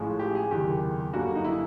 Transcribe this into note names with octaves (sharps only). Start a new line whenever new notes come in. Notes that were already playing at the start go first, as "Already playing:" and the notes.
Already playing: A1 A2 F3 G#3 C#4
G4
G#4
F#1 E2 C3 D#3 G4
G1 F#2 D3 G3 A#3 F#4
D#4
E4